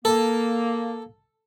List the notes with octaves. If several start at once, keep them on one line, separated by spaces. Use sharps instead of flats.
A#3 A4